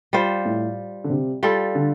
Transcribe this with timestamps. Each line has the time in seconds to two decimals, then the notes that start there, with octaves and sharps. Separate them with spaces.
0.13 G3 F4 C5
0.45 A2
1.04 D3
1.09 C3
1.43 G3 F4 A4
1.75 D3